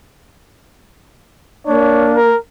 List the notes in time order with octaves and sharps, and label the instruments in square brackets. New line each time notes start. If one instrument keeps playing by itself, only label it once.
[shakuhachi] A#3 [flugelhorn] D4 [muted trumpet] C#5
[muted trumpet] A#4